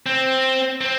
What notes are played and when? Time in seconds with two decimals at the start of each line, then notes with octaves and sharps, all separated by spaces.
0.06 C4
0.81 C4